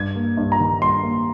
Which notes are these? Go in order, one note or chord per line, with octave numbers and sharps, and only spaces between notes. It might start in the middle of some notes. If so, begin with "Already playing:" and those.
Already playing: G2 G#6
A#3
G2
A#5
D#3
G2 C6
A#3